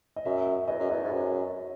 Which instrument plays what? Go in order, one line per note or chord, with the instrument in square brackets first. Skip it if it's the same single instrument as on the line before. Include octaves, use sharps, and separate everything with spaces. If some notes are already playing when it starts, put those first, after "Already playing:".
[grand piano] D#5
[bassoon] F#2 [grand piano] E5
[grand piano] E5
[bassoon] E2 [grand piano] D#5
[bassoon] F#2
[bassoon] E2 [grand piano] D#5
[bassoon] G#2
[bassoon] F#2 [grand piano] C#5